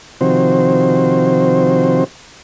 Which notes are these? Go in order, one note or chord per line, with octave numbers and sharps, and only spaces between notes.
C3 D#3 F3 C4 F#4 C5